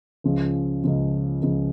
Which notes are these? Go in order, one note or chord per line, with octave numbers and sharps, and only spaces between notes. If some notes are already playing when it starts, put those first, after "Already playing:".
C#2 C#3 F3
C#2 C#3 F3
C#2 C#3 F3